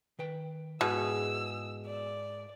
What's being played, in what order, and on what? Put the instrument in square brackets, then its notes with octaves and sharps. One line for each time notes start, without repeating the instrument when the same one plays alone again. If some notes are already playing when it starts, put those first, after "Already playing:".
[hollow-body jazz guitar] D#3 B4 G5
[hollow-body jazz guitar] G#2 E4 [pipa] B2 [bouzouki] G#4 [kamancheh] E6
[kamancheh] D5